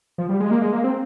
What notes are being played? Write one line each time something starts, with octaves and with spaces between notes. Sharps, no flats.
F3
G3
G#3
A#3
G#3
A#3
C4